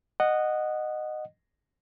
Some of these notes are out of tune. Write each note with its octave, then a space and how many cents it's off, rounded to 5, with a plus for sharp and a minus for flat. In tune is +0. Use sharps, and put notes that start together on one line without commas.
D#5 -15 F#5 +0